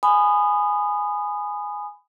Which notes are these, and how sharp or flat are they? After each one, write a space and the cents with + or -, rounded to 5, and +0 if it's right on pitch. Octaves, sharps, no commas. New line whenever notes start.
G#5 +0 B5 +20 D#6 -20